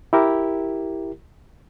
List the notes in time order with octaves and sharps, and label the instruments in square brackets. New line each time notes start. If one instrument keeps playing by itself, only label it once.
[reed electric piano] E4 G4 A#4